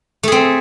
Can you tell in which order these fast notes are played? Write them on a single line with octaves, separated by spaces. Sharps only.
A3 G#4 C4